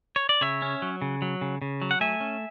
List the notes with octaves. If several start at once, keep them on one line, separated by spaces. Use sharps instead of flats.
C#5
D5
C#3 C#5 E5
C#4
F#3
C#3
F#3
C#3
C#3
F#3
F#5
A3 E5 G#5
C#4